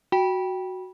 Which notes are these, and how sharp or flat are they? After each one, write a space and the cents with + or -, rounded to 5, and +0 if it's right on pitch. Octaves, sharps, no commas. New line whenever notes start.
F#4 +0 G5 +0 B5 -20